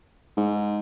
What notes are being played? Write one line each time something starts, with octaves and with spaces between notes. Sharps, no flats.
G#2